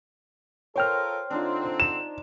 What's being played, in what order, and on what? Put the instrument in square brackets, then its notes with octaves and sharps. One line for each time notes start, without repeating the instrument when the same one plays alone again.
[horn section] F4 A4 A#4 [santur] C5 [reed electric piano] C#5 G5 F6
[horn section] D3 C4 [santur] D4 D#4 F4
[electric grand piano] E7